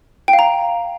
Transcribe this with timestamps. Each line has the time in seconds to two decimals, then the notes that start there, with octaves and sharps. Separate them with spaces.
0.28 G5
0.33 F5
0.39 A#5